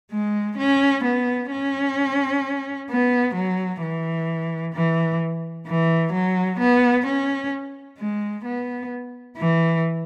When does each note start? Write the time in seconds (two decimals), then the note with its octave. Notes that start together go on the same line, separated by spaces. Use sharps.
0.12 G#3
0.58 C#4
1.04 B3
1.51 C#4
2.90 B3
3.36 F#3
3.82 E3
4.75 E3
5.67 E3
6.13 F#3
6.60 B3
7.06 C#4
7.99 G#3
8.45 B3
9.38 E3